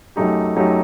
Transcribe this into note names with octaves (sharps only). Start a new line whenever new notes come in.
F#2 F#3 A3 D#4 G4
F#2 F#3 A3 D#4 G4